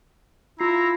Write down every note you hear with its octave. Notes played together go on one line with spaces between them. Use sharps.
E4 F4 A#5 C7